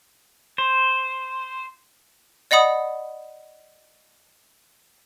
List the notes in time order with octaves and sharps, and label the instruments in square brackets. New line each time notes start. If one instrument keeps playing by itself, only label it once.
[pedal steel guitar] C5
[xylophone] D5 D#5 F#5 B5 D#6